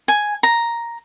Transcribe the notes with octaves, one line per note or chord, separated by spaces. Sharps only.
G#5
A#5